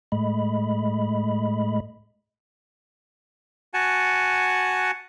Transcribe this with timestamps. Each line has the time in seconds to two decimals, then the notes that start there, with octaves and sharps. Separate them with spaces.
0.12 A2 G#3 A3 D#5 B5
3.74 F#4 F#5 G#5 A5